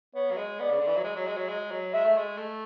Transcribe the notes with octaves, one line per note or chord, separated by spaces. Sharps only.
B3 C#5
F#3
G#3
B3 D5
C#3
D3
E3
F#3
G#3
F#3
G#3
F#3
G#3
F#3
G#3 E5
A3
G#3
A3